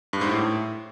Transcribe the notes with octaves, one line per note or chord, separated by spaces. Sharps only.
G2
G#2
A2